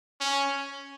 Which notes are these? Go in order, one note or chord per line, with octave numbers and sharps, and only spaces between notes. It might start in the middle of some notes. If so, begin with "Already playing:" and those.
C#4